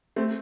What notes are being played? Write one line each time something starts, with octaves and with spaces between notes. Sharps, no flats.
A3 C4